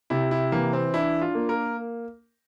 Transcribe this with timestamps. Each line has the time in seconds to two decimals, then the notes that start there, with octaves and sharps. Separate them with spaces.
0.10 C3 E4
0.31 E4
0.52 E3 A#3
0.73 C4
0.94 D4 E4
1.21 F4
1.35 A#3
1.49 A#4